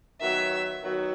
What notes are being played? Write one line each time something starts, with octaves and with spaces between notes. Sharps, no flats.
D#3 F#3 B3 F#4 E5
D#3 F#3 B3 F#4